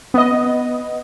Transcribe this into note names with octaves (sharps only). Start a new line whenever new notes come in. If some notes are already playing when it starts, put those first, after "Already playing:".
B3 D#5